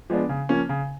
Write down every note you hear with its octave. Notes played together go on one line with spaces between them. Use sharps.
F3 G#3 B3 D4
C#3
F3 A#3 C#4
C#3